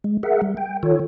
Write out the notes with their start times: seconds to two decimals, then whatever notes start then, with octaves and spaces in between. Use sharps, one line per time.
0.04 G#3
0.23 G#4 A#4 E5 F#5
0.42 G3
0.57 G5
0.83 D#3 F4 A4 C#5